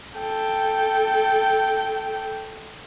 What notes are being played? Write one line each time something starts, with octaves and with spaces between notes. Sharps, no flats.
A4 G5